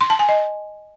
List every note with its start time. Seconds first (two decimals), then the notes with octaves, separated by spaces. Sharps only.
0.01 C6
0.10 A5
0.19 G#5
0.29 D#5